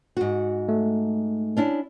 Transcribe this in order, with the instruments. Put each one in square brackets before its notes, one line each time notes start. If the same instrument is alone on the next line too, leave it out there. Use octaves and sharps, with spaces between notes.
[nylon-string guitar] G#2 F#4
[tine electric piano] A3
[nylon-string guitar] C#4 D4 E4